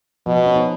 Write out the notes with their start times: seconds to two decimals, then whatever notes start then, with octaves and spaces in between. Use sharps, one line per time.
0.26 B2 F3
0.36 B3
0.46 C#4
0.56 D#4